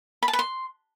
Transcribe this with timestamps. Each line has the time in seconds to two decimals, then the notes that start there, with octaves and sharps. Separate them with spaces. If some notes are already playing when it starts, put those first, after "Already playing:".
0.23 B5
0.28 A5
0.33 B4
0.39 C6